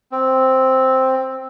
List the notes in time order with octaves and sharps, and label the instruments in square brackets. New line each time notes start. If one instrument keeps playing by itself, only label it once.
[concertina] C4